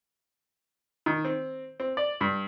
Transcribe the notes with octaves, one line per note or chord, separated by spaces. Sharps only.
D#3
C4
C4
D5
G2